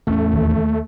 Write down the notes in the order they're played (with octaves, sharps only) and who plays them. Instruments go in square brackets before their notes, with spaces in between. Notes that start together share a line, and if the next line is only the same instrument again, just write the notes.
[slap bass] A1 E2 C#4 [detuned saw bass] A3
[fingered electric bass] D#2